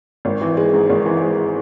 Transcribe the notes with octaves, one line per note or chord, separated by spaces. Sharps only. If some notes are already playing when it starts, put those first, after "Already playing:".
G#1
E3
G#3
G#2
G#1
E3
G#3